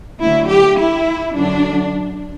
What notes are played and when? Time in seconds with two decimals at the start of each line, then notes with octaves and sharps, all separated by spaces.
0.20 D2 D3 F#3 E4
0.49 G4
0.78 E4
1.35 F#2 D3 F#3 D4